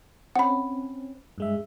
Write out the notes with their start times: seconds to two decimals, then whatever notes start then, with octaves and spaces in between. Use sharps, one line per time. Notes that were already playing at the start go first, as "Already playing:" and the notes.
0.36 C4 C#4 F#5 B5
1.38 G2 G#3 E5